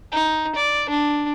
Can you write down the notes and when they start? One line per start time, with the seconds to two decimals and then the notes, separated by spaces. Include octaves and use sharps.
0.12 D#4
0.55 D5
0.89 D4